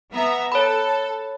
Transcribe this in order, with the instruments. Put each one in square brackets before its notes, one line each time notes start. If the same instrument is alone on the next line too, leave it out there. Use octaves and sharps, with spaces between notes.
[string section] B3 E5 A#5
[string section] A4 [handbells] C#5 B5